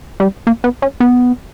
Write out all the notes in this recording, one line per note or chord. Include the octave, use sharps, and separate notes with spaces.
G3
A#3
B3
C#4
B3